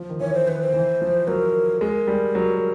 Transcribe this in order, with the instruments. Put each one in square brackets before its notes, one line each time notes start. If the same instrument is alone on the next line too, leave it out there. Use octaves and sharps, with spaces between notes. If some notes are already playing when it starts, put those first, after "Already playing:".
Already playing: [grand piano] F3
D#3
[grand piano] E3 [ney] C#5
[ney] C5
[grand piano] D#3 [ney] B4
[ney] C5
[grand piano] E3
F3
[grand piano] F#3 [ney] A#4
[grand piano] G#3 [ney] A#4
[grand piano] G3
F#3